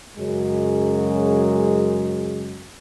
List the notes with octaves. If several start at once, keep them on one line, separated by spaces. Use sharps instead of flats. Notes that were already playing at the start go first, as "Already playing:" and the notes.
F#2 C#3 F#3 G#3